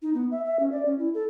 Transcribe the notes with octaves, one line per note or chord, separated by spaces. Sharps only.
D#4
B3
E5
E5
C#4
D5
C#4
E4
A4